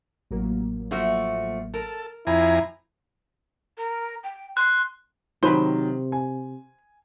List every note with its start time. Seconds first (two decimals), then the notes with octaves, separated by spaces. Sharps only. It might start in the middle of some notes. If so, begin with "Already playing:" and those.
0.31 A1 F#3 A#3
0.91 F3 A3 F#4
1.74 A4 A#4
2.27 F2 E4 G#5 A#5
3.77 A#4
4.24 G5
4.57 C6 F#6
5.43 C3 D#3 F#3 G4 B4 C5 G7
6.12 G#5